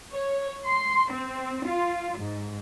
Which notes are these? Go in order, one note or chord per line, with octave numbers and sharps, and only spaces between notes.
C#5
C6
C4
F4
G#2